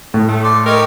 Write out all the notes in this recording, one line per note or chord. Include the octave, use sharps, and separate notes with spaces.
A2
A3
D5 C6
D#4 G4 A#4 C#5